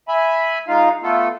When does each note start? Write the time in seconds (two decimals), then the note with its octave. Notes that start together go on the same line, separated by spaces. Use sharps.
0.08 E5 G#5 B5
0.68 G#3 D#4 F4 F5
1.02 A3 B3 F4 A4